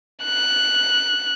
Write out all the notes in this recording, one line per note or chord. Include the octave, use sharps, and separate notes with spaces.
F#6